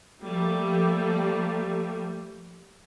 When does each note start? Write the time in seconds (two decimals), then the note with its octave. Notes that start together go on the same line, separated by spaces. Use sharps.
0.22 F3 G3 A3 A#3